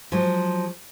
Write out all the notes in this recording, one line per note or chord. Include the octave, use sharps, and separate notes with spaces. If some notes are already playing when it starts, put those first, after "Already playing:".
F3 F#3 G#3